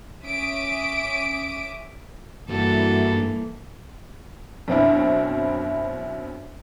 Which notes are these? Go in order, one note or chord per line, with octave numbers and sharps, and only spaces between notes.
C#4 E5 D6 D#6 D7
G2 E3 G3 A#3 E4 F#4 A4
F#2 B2 C4 D4 E4